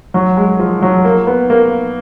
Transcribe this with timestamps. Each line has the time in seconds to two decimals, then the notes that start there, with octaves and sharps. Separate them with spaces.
0.14 F#3
0.37 G#3
0.59 F3
0.82 F#3
1.05 A#3
1.27 B3
1.50 A#3